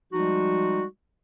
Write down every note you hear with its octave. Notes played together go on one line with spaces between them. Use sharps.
F3 G3 G#3 D#4 F#4